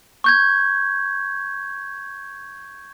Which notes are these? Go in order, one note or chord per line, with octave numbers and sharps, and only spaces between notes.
C#6 G6 G#6